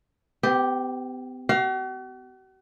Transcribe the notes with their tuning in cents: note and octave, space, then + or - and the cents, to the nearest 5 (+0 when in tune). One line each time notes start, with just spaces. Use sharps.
B3 +45 G4 +0
F#4 +45 F5 +0